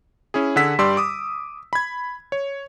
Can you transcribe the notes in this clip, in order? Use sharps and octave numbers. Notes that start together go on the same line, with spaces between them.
C#4 E4 G#4
D3 G#4 F#5 E6 B6
G2 G3 G4 D5 C6 E6
D6 D#6
B5 G#6
C#5